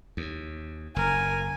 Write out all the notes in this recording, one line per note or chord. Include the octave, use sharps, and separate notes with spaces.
D#2
F#1 A#4 G#5